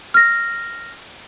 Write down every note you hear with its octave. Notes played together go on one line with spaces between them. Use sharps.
F6 A#6